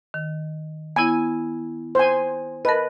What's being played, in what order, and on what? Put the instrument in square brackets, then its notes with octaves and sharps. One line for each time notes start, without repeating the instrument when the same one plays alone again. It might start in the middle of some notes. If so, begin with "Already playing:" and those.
[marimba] D#3
[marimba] B3 E4 [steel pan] G#5
[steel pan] C5 G#5
[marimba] A#4 D#5 [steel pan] B4 A5